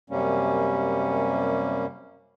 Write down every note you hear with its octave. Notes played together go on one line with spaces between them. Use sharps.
F#2 C3 G3 A#3 C#4